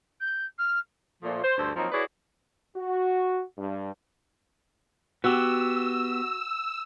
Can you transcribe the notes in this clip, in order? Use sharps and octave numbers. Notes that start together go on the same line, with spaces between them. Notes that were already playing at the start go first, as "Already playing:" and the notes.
G6
F6
A#2 F3 A3
C5
D2 G2 A4 C5
F3 F#3 A#3 C4 D#4
E4 F#4 G#4 B4 C#5 D5
F#4
G2
B3 F#4 G4 E6